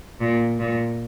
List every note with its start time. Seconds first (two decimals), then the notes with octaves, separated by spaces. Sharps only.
0.21 A#2
0.59 A#2